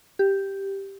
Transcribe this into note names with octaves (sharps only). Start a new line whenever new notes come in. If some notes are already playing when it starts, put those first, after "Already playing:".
G4